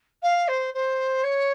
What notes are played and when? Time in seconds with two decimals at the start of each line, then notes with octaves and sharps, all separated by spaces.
0.22 F5
0.48 C5
0.74 C5
1.23 C#5